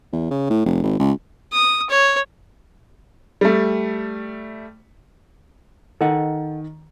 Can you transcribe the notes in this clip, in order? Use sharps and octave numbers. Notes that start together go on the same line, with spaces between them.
E2
C#3
A2
F1
G#1
C#2
D#6
C#5
G3 A3
D#3 A4 D#5 F#5